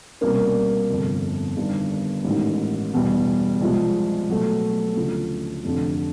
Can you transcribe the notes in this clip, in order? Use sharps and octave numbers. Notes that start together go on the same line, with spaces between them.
C2 B2 G3 A#3 C#4
G1 F2 C3
G1 G2 D#3
A1 G#2 D#3
E2 B2 G3
C2 C3 F3 G#3
B2 F#3 A3
D2 C#3 F3
F1 F2 D3